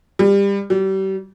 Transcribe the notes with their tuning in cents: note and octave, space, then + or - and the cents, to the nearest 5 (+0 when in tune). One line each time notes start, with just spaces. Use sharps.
G3 +25
G3 -35